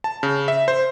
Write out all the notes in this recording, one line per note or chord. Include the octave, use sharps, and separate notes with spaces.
A5
C#3
E5
C5